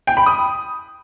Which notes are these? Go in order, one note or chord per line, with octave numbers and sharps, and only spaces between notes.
G5
B5
D#6